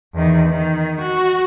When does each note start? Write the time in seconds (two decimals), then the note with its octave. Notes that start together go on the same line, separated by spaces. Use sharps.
0.15 E2 D#3
0.49 D#3
1.01 F#4